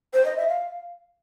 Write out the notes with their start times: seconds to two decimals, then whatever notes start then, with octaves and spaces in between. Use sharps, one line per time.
0.13 C5
0.25 D#5
0.37 E5
0.48 F5